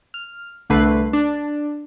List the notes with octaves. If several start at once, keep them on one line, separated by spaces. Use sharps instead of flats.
F6
C2 D3 A3 B4 F#6 C7
D4